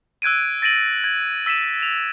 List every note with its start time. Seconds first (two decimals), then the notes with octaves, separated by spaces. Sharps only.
0.22 E6 F#6 G#6 D7 D#7
0.62 A6 A#6 D7 D#7 F#7
1.04 G#6
1.46 E6 B6 D#7 E7
1.83 F7